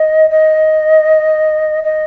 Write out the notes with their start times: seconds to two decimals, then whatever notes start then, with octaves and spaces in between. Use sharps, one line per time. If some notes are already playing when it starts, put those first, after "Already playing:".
Already playing: D#5
0.30 D#5
1.83 D#5